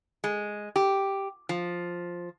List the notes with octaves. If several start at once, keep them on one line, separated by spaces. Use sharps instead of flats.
G#3
G4
F3